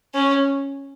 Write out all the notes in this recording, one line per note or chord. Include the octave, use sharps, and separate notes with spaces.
C#4